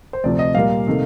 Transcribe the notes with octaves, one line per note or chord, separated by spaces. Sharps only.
C5
D2 C3 F3 D5
D#5
A#2 G3 A#3 F5
C3 D#3 A3